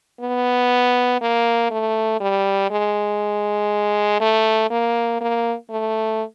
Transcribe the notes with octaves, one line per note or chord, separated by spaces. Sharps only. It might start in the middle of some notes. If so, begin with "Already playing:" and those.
B3
A#3
A3
G3
G#3
A3
A#3
A#3
A3